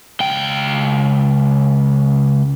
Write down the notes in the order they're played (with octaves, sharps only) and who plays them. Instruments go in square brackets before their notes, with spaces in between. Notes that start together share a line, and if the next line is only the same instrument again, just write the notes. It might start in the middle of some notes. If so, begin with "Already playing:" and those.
[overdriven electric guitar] C#2 G5